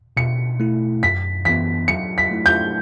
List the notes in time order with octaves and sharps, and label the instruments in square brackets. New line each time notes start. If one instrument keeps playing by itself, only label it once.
[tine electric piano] B2 [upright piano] C#7
[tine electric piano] A3 E4
[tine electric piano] F#2 [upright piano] B6
[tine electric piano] E3 B3 [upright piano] B6
[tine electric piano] F#3 [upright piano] C#7
[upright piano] B6
[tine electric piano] A3 E4
[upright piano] G6